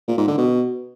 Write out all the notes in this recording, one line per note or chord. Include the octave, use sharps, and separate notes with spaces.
A#2
G#2
D3
B2